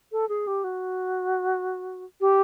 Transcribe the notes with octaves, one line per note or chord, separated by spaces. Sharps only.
A4
G#4
G4
F#4
G4